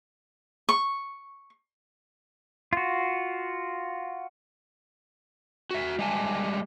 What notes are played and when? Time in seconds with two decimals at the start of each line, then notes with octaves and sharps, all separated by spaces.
0.69 C#6
2.73 F4 F#4
5.71 F#4 E5
5.99 G3 G#3 G4 E5 G#5 A5